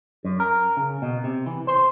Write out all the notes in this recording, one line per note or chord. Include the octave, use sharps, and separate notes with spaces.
F#2
A#4
C#3
B2
C3
E3
C5